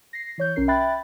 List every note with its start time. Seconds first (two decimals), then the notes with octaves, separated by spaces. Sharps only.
0.13 A#6 C7
0.38 E3 C#5 G6
0.56 B1 C#4 A#4 C7
0.68 E5 G5 B5 F#6 A6